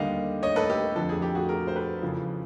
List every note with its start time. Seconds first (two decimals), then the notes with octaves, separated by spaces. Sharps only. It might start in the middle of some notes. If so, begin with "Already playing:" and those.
Already playing: D#2 D3 G3 D#5 F5
0.43 C#5 D#5
0.56 A4 B4
0.69 G4 A4
0.96 F2 D3 F3 A4
1.09 G#4
1.22 G4
1.35 F#4 G#4
1.49 G#4 A#4
1.67 C5
1.76 A4 B4
2.02 E2 C#3 F3